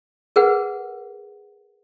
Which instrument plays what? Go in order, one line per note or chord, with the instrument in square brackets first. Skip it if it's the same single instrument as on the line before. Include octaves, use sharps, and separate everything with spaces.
[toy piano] G#4 A#4 B4 F#5